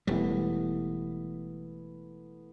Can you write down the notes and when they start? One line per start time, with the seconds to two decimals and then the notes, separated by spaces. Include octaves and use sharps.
0.07 E1 G3 A3 B3 E4